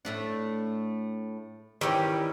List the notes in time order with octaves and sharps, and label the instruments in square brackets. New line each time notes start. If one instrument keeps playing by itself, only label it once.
[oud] A2 A3 D4
[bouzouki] D#3 E3 G3 [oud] C#4 D#4 G4